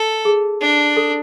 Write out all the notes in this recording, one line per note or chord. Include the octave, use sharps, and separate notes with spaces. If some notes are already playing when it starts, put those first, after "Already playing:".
Already playing: A4
G#4
D4
A4